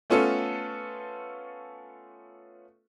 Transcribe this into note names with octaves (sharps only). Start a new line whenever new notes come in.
A3 B3 C#4 F4 A4